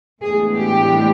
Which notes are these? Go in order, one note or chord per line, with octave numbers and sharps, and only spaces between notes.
A2 E3 G#3 B3 D4 G#4
G4